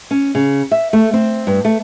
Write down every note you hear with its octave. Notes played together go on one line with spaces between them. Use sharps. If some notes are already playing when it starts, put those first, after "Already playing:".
C#4
C#3
E5
A3
C4
G2
A3